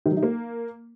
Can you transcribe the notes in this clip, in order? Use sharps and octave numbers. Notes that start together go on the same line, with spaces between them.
D#3
F#3
D#4
A#3